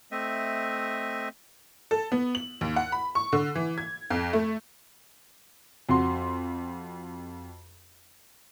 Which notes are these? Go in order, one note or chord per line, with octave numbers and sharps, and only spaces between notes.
A3 C4 D#5 E5
A4
B3
F#7
D#2
F#5
B5
C#6
D3
E3
G#6
F2
A3
F2 F#4 C6